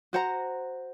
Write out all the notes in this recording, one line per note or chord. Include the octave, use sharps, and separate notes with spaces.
F#4 C5 F#5 A#5